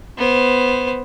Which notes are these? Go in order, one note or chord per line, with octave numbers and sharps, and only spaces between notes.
B3 C5